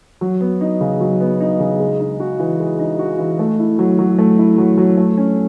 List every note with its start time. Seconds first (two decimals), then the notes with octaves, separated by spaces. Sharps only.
0.21 F#3
0.41 B3
0.61 D#4
0.81 C#3
1.00 F#3
1.20 B3
1.40 D#4
1.60 C#3
1.80 G#3
2.00 D#4
2.20 F#4
2.40 E3
2.59 G#3
2.79 D#4
2.99 F#4
3.19 E3
3.39 A3
3.59 E4
3.79 F#3
3.99 F#3
4.18 A3
4.38 E4
4.58 F#3
4.78 F#3
4.97 A3
5.17 C#4